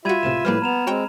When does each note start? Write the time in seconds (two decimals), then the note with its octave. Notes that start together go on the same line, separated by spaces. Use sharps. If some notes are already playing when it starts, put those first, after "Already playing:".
0.05 G3 F4 F#4 E5 B5 G#6 D#7
0.23 C#2 A2 C3 E7
0.45 A2 F3 G3 A#3 B4 B5 F6
0.62 B3 A#5 E7 F7
0.87 G#3 C4 F#4 C#5 G5